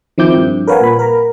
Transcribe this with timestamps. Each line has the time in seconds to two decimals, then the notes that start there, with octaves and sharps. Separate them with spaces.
0.18 D#3 F3 C4 E4 D6 G6
0.37 G2
0.68 A#4 B4 C#5 F5 F#5 G#5
0.81 A#2 B5
0.99 A#4 A#5